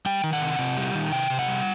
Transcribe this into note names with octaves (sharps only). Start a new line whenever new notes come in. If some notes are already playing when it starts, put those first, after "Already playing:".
G3 G5
D#3
F#5
C3
C3
G3
D#3
C3 G5
C3
F#5
G3